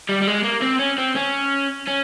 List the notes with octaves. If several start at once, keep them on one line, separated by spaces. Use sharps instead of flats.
G3
G3
G#3
A#3
C4
C#4
C4
C#4
C#4